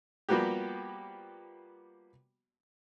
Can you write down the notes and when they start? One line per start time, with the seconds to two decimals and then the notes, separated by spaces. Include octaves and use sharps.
0.29 F3 G3 A#3 B3 F#4 G4